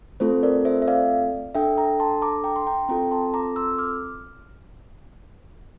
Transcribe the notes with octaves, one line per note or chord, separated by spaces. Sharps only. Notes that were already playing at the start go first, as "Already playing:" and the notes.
A3 C4 F4 A4 C5
A#4 D5
C5 E5
E5
D5 F5
D4 A4 E5 G5
G5 A#5
A5 C6
A#5 D6
G5 A#5
C6
G5 A#5
C4 F4 A4 G5 A#5
A5 C6
A#5 D6
C6 E6
D6 F6